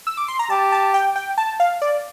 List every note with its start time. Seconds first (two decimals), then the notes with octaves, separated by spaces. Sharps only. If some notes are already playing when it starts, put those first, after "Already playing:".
0.07 E6
0.17 D6
0.28 C6
0.39 A#5
0.50 G4 A5
0.72 A5
0.94 G5
1.16 G5
1.38 A5
1.60 F5
1.82 D5